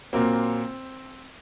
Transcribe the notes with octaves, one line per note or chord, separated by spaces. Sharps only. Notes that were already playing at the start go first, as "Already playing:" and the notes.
A#2 F#3 A#3 C4